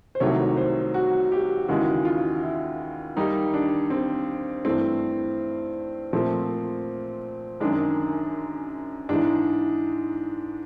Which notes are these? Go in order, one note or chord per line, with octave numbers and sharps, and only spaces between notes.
C5
C2 C3 D#3 F#3 A3 C#5
C5
F#4
G4
D#2 C#3 E3 G#3 F#4
F4
E4
D#2 D#3 G3 D#4
D4
C4
G2 E3 A3 C4
A#2 F3 A3 C4
F#2 D#3 G#3 D4
G#2 E3 G#3 D4